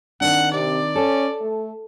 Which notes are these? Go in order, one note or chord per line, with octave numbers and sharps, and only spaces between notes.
D#3 C4 D4 F#5
C3 D5
C#4 A4
A3